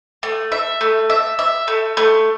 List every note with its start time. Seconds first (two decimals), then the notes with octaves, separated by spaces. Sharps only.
0.23 A3
0.52 E5
0.81 A3
1.10 E5
1.39 E5
1.68 A3
1.97 A3